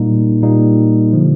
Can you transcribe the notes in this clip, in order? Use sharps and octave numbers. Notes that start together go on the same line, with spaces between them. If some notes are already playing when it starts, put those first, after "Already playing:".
Already playing: A#2 G3 A#3 D#4
A#2 G3 A#3 D#4
D3 F3